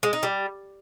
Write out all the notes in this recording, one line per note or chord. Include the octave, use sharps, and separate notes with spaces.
G#3
D#4
G3